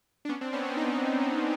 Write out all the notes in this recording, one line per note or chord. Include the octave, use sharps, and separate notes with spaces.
D4
B3 C#4
C4 D4
B3 C#4
C4 D4
C#4 D#4